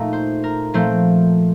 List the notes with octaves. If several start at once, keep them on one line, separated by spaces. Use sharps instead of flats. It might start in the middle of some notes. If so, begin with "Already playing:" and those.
Already playing: A#2 A3 D#4
C5
A#4
A#2 F3 A3 C4 C5